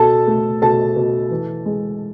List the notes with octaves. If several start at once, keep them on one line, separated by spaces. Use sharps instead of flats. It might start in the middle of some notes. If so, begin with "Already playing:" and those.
Already playing: B2 A4 A5
A3
B2 A4 A5
B2
E3
G#3